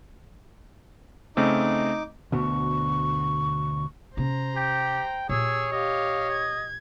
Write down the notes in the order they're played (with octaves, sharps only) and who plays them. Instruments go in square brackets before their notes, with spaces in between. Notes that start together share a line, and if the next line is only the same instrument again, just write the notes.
[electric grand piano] C#3 A3 C4 [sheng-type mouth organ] D#4 D6
[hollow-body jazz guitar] D2 B2 [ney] C#6
[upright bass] C3 C#4 [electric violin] C5 A#5
[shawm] G4 [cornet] G5
[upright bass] A#2 [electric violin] G4 E6 [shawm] G#4 [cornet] C#5
[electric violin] G4 F5 [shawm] D#5
[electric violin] G#6